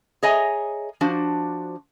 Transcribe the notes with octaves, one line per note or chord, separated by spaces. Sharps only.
G#4 C#5 D#5 E5 G#5 A#5
F3 D4 F#4 C5